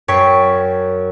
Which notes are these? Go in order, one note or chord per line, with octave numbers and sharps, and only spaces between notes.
F#2 C#5 G5 C#6 B6 C7